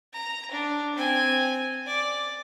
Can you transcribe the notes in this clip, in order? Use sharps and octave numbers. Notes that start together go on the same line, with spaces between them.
A#5
D4
C4 G#5
D5